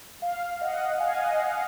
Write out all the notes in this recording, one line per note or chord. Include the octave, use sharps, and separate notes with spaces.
F5
D#5 F#5
F5 G#5
D#5 F#5
F5
D#5